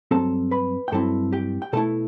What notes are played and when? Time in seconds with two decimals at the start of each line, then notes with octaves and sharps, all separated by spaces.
0.11 G2 F#3 C4 A4 A5
0.51 B4 B5
0.88 G5
0.92 G2 F#3 C4 E4 A4 A5
1.33 G4 G5
1.62 G5
1.73 B2 A3 E4 A4 A5